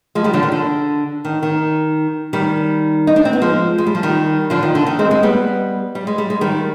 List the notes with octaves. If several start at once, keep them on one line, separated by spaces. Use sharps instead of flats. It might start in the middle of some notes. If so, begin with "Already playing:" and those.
F3 G#3
D#3 G3
D3 F3
D#3
D3
D#3
D#3
D#3 G3
D#4
D4
C4
B3
F3 G#3
G#3
G3
F3
D#3 G3
D3 F3
D#3
D3
D#3
G#3 C4
G#3 C4
G3 B3
G3
G#3
G3
G#3
D#3 G3